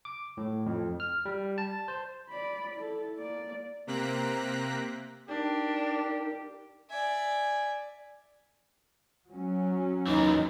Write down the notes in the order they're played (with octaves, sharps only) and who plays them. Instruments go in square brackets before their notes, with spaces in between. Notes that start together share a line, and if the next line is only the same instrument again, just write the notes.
[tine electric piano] D6
A2
F2
F6
G3
A5
C5
[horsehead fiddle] D5 B5
E4 A4
A#3 D5
[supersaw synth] C3 A#3 C4 A#5 F#6 B6
[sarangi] D4 [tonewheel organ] D#4 A#4 [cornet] G4
[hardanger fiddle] D5 E5 [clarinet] G#5
[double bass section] F#3 C#4
[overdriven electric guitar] D#2 E3 [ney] D#4